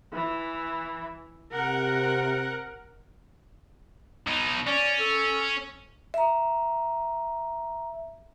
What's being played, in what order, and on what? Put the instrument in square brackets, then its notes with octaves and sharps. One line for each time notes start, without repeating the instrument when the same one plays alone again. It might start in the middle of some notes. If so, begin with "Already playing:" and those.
[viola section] E3
[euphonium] C3 [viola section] A#4 F#5
[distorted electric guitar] B2 D#4
[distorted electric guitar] C#4 [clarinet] D5
[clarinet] A4
[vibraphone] E5 A#5